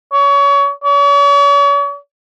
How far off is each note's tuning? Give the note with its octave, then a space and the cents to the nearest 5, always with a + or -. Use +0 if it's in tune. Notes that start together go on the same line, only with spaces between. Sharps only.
C#5 +30
C#5 +40